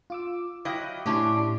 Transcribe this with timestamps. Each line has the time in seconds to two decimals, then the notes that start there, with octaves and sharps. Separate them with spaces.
0.10 F4 D6 E6
0.65 F#3 E4 D#5 F5 G5 D6
1.06 A2 C#4 D4 E4 G4 C6